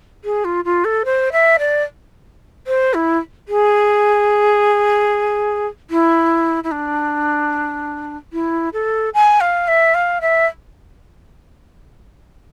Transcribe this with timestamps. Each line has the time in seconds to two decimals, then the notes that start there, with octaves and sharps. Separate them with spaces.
0.24 G#4
0.44 F4
0.65 F4
0.84 A4
1.05 C5
1.32 E5
1.59 D5
2.67 C5
2.94 E4
3.48 G#4
5.90 E4
6.64 E4
6.71 D4
8.33 E4
8.73 A4
9.14 G#5
9.40 F5
9.67 E5
9.94 F5
10.21 E5